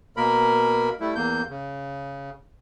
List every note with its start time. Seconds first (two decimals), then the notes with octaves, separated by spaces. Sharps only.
0.17 B2 A#3 A#4 B5
1.00 G3 A3 E4
1.16 E2 A#3 G6
1.50 C#3